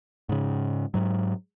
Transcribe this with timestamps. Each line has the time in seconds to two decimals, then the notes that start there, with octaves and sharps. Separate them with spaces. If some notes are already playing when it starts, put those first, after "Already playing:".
0.29 G#2 C#3
0.94 G#2 F#3